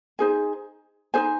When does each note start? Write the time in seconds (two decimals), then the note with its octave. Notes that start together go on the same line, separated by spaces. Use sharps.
0.19 D#4 G#4 C5 G#5
1.14 D#4 G#4 C5 G#5